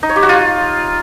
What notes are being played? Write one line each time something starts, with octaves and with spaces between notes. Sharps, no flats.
D#4
C#5
G4
F#4
F4